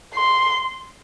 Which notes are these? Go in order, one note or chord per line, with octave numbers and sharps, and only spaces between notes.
C6